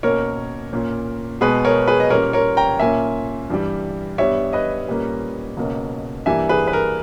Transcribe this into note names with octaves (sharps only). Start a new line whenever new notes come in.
B2 A#3 C#4 A#4 C#5
A#2 A#3 C#4
B2 G#3 B3 G#4 B4
A#4 C#5
G#4 B4
D#5
A#2 G3 A#3 C#4 A#4 C#5
A#4 C#5
G5 A#5
A#2 A#3 C#4 E5 G#5
G2 E3 G3
G2 G3 B3 C#5 E5
B4 D#5
A#2 G3 A#3 C#4
C#2 B2 A#3 C#4
G2 E3 G3 A#3 E5 G#5
G#4 B4
B4
A#4